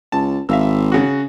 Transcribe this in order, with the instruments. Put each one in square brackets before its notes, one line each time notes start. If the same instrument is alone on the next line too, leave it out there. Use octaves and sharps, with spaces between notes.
[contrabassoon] C#2 [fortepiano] A5
[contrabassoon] G#1 [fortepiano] E5 F5 E6
[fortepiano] C#3 F#4